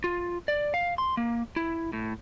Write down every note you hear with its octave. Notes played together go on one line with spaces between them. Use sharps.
F4
D5
F5
C6
A#3
E4
A2